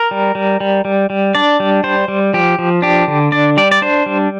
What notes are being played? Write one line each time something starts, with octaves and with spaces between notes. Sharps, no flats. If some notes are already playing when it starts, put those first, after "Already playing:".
Already playing: A#4
G3
G3
G3
G3
G3
D4 D5
G3
G3 C5
G3
F3 G4
F3
D4 G4
D3
D4 D5
G3 D5
D5
D4 C5
G3